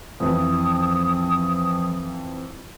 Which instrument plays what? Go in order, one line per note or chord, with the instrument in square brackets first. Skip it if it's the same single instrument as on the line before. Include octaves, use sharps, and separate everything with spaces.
[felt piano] F2 E3 [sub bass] F3 [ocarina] D#6